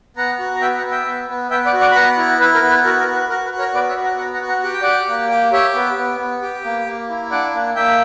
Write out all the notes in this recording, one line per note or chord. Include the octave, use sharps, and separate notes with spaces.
B3 F#5 A#5
F#4
A#5
B3 E5 G5
F#5 A#5
B3
E5 G5
B3
B3
B3 E5 G5
D5 F#5
F#4
D5 F#5
B5
B3 F#5 A#5
E4
E4 B4
A#4
B3
B4
F#4 A#4
A#4
F#4
B4
F#4 A#4
B4
F#4
A#4 C#5
B3 B4 D5
C#5 E5
F#4
F#5 A#5
B3 F#5 A#5
F#5 A#5
F#4
F#5 A#5
G4 F#5
G5
G4 D5 F#5
A#3
G4
G4 C#5 E5
B3
B3
B3
G4
A#3
A#3
E4
D4 D5 F#5
A#3
A#3 E5 G5